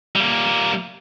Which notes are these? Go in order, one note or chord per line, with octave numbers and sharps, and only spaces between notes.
G3 A#3